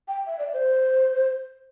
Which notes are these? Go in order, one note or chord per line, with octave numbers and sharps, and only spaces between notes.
G5
E5
D5
C5